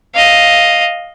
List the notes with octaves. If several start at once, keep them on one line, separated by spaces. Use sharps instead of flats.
D#5 F5